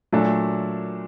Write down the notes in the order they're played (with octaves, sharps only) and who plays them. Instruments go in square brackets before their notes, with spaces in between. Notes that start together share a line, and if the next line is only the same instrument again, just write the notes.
[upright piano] A#2 F#3 A3 D4